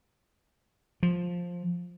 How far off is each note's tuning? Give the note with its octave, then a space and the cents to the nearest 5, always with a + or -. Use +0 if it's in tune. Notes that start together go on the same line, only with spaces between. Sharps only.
F3 +10